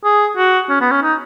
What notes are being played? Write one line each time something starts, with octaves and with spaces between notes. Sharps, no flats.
G#4
F#4
C#4
B3
C#4
D#4